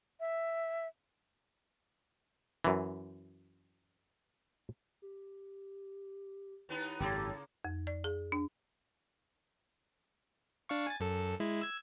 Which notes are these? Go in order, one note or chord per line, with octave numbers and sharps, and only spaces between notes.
E5
F#2 E3
G4
D#2 B3 D#4 E4
G#1 F#2 C#3 A#3 G4 A4
F2
D5
G#4
D4
D4 F5 C#6
G#5 A6
F#2 A4
G#3 E4
E6 G#6